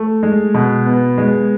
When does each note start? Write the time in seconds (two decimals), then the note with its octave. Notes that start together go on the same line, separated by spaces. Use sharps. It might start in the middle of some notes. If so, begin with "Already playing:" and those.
Already playing: A3
0.23 G#3
0.54 B2
0.86 B3
1.18 G#3